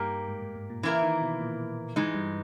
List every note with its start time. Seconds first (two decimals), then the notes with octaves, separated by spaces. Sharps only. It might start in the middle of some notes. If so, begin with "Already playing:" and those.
Already playing: G2 A#3 D#4 G4 A#4
0.28 G#2
0.42 G#2
0.56 G#2
0.70 A#2
0.83 C#3 E3 A#3 E4 A#4
1.02 D#3
1.21 B2
1.40 A#2
1.96 G#2 E3 G#3 D#4
2.15 G2